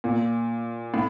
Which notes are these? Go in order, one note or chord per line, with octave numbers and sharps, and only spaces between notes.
A#2
A2